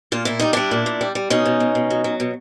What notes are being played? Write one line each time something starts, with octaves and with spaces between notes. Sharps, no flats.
A#2 F4
A#2 E4
G3 D#4
G3 D4 E4
A#2
A#2
G3
G3
B2 C#4 D#4
B2
B2
B2
F#3
F#3
B2